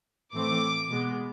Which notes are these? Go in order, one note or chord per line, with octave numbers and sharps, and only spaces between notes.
A2 E3 A3 C4 D6
B2 G#3 B3